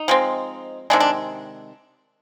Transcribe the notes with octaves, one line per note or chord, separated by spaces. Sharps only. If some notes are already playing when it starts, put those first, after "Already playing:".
Already playing: D#4
F3 G#3 C4
C3 D#3 G#3 D4
D4